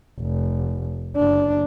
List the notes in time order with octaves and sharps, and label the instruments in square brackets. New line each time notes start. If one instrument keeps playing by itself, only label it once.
[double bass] F1
F#1 D4